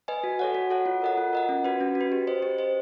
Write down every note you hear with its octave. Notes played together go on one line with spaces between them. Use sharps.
B4 D#5 G#5
F#4
A4 C#5 F#5
F#4
A4 C#5 F#5
F4
A#4 D#5 F#5
F4
A#4 D#5 F#5
C#4
F#4 B4
C#4
F#4
B4
G4
C5 D#5
G4
C5 D#5